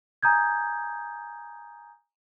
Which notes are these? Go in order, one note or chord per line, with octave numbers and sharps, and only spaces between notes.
G#5 A#5 D#6 G6 G#6